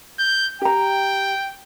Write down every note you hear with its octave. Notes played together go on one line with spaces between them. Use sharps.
G6
G4 G5 A#5